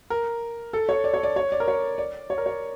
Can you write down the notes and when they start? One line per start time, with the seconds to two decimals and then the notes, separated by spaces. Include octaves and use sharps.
0.10 A#4
0.73 A4
0.89 C#5
1.04 D5
1.14 C#5
1.23 D5
1.36 C#5
1.52 D5
1.60 A#4
1.68 C#5
1.98 D5
2.30 C#5
2.38 A#4
2.46 C#5